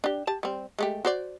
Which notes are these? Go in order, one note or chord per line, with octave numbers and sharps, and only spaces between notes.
D4 G4
G4 A5
G3 C4
G#3 A3 G4
F#4 C5 D5